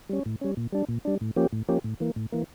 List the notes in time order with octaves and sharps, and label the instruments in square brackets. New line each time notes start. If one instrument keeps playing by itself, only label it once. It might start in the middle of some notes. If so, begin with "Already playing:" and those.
[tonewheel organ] G3 C#4
A2
G3 C#4
A#2
G3 D4
A#2
G3 D4
A2
F3 A#3 C#4 G4
A2
F3 A#3 C#4 G4
A2
E3 A#3
A2
E3 A#3